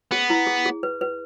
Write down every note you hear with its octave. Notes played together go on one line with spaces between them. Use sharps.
B3 G#4
E4
G#4
G#4
B4
B4